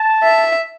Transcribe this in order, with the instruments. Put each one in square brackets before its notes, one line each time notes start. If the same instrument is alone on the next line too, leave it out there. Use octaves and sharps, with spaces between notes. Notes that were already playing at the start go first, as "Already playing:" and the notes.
Already playing: [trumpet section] A5
[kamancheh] E5